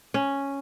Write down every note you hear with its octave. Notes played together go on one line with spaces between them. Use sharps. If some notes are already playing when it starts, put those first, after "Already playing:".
C#4